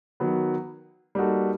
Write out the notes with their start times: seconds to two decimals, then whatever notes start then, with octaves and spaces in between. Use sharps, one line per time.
0.20 D#3 F#3 B3
1.15 G3 A#3 D#4 F#4 A4